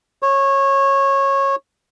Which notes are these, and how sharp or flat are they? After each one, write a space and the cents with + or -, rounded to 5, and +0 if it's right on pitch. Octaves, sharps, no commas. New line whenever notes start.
C#5 -20